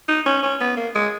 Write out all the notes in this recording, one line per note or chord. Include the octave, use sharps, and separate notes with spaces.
D#4
C#4
C#4
B3
A#3
G#3